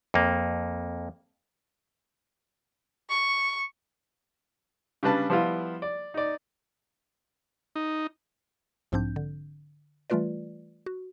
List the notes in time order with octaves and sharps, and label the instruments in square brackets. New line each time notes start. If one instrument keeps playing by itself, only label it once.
[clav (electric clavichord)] F2 A#3
[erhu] C#6
[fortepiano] C#3 G3 D4 B4 A5
F3 G3 B3 E4 F4
D5
D#4 D5
[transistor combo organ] D#4
[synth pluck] B1 G#2 F3 C4 D4 G6
D3
E3 G3 A3 F4 B4 D5
F#4